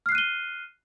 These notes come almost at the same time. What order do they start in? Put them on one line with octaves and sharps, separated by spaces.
F6 C7 F#6 D#7 G7